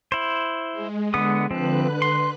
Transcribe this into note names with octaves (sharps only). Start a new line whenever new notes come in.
E4 C5
G#3
D3 B3 D#6
D3 F3 C4 B4 F#6
C6